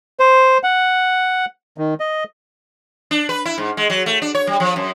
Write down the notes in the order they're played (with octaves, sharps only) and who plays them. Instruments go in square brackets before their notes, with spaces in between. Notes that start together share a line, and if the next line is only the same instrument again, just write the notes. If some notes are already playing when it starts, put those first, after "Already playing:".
[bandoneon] C5
F#5
D#3
D#5
[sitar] D4
B4
E4
G#2
G#3
F#3
A3
D4
C#5
G3
F3
F#2